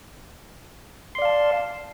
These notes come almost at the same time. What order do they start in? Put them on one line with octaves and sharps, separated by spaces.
C6 D5 F5 A5